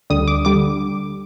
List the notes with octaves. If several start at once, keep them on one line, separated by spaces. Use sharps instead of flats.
D2 D3 G3 D#6
D6
D3 G3 D6